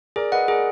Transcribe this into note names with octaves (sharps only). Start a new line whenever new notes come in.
G#4 A#4 D5
B4 D#5 F#5
G#4 A#4 D5